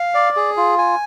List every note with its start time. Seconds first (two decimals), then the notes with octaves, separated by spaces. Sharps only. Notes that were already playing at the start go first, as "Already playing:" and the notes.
Already playing: F5
0.14 D5
0.37 G#4
0.57 F4
0.78 G#5